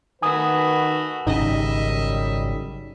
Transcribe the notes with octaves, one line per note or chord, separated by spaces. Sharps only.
D#3 A3 F#4 B4 G#5 D#6
G#1 F#2 C#3 G3 D#4 D#5 E5